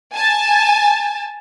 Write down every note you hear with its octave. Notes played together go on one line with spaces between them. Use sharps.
G#5 A5